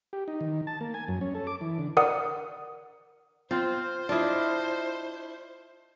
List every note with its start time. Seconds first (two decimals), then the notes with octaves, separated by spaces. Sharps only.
0.13 G4
0.28 D#4
0.41 D#3
0.67 A5
0.81 A#3
0.94 G#5
1.08 F#2
1.21 C#4
1.35 A4
1.47 D6
1.61 E3
1.79 D3
1.97 A#4 D5 F#5 D#6
3.51 C4 F4 C5
4.09 D4 E4 F4 D#5